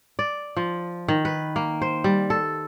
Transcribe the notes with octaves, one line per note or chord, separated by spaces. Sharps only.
D5
F3
D#3
B4
A#3
C5
G3
A4